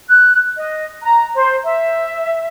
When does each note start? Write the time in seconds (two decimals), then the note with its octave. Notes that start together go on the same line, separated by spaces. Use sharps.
0.08 F#6
0.56 D#5
1.01 A#5
1.35 C5
1.63 E5